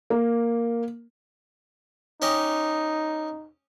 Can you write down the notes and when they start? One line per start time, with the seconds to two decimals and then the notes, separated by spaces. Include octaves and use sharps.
0.10 A#3
2.22 C#4 D#4 G4 D#5